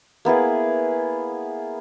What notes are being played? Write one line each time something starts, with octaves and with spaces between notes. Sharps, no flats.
A#3 B3 E4 G#4